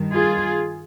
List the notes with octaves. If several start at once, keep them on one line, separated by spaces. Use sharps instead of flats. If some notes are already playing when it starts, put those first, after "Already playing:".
Already playing: G2 D#3
F4 G#4